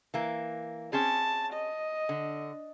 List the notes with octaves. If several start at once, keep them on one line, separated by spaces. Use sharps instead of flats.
E3 A#3
C4 C#4 G#4 A5
D#5
D3